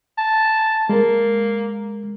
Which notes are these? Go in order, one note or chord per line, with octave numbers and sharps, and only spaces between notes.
A5
G#3 A#3 A#4